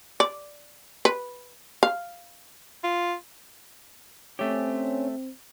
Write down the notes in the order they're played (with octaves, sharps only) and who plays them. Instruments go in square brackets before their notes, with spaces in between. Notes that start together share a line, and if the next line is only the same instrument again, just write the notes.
[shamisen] D5
B4
F5
[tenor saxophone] F4
[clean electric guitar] A3 G4 [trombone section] C4 [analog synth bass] C#4